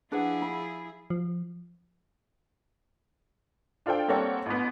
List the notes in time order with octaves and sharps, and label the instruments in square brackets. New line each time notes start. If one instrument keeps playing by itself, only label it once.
[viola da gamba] F3 E4 G#4 [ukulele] D4 B4 F#5
[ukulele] B5
[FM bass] F3
[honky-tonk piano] D4 F4 A4 C5 G5
G3 A#3 C4 A4 C#5 F#5
A1 B3